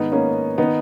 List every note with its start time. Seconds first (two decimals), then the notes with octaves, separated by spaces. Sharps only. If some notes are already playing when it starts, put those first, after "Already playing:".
Already playing: G#2 D#3 B3 D#4
0.12 A#3 C#4
0.58 D#3 B3 D#4